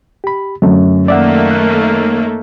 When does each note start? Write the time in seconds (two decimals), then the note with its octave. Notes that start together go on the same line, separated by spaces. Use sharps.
0.24 G4 B5
0.62 F#2 D3 F#3 A3
1.08 D#3 A3 A#3 D5 E5 F#5
1.51 F#6